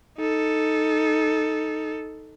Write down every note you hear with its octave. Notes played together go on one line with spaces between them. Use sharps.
D#4 A4